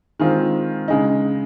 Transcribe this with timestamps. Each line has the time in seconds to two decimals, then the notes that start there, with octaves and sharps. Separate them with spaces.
0.20 D#3 G#3 C4 F4
0.88 C#3 G#3 D#4